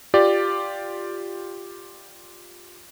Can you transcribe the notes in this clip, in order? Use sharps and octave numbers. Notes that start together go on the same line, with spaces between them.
F4 G4 D5